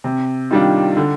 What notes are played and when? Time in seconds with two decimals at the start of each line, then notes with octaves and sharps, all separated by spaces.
0.04 C3
0.51 D#3 G3 D4 F4
0.97 D3